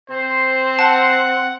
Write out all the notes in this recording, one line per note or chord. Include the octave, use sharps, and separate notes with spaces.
C4 C5
F#5 A5